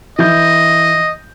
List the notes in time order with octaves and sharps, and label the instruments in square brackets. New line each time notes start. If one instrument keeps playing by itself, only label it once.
[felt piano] E3 E5 G6 [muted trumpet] D#5